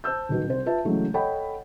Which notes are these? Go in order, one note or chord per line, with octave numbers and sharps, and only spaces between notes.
C5 A5 E6 G6
D#1 B1 F#4 B4
C2 C5
F4 B4 E5 A5
C#3 E3 F#3 G#3 A3
A4 C#5 D#5 F#5 G5 B5